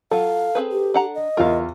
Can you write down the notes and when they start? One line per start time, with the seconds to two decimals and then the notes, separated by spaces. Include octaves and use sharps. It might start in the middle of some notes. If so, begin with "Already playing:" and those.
0.11 F#3 F4 A4 F5
0.55 C4 G#4 B4
0.72 G4
0.94 D4 F#5 A#5
1.15 D#5
1.37 E2 F4 A#4 F5